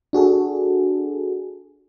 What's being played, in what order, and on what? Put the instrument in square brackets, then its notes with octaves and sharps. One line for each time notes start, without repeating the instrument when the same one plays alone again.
[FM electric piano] D4 F#4 G#4 A4